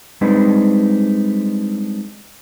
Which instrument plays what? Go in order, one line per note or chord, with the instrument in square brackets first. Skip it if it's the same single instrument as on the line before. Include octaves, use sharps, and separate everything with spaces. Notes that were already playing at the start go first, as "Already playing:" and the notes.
[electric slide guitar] G3 G#3 C4 D4 D#4 B4